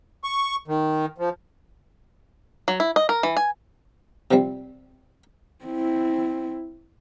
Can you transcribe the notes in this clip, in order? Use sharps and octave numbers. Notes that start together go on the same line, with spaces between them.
C#6
D#3
F3
F#3
E4
D#5
A#4
E3
G#5
C3 F3 G3 C4
C4 E4